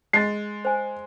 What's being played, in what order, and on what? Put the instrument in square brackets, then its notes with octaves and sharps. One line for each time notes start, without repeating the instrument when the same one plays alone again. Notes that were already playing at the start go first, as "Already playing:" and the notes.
[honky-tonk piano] G#3 [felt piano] A6 C7
[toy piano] C5 G#5